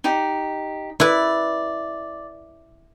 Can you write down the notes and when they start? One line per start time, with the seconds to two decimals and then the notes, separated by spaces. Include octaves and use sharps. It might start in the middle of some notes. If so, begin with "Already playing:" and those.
0.04 D#4 G4
1.00 E4 B4 D5